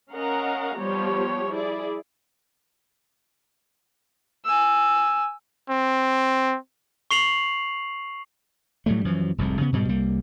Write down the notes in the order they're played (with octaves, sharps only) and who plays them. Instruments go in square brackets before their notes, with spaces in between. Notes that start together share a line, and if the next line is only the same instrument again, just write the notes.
[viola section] C#4 A#4 D#5 F5 F#5 A#5
F3 G3 B3 G4 C#5
E4 G#4 D5
[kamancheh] G#5 E6
[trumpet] C4
[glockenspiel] C#6 C7 F7 F#7
[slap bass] A2 F#3 G3 A3
F#2 E3 F3
F1 C2 F2 G#2
C#3 B3
G#2 B2 G3 G#3
C2 G3 A#3